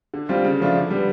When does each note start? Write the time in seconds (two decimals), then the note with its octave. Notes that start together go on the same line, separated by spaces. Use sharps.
0.14 D3
0.29 G3 C4 F4
0.45 C#3
0.60 F3 A3 D4 F4
0.75 D3
0.90 G3 B3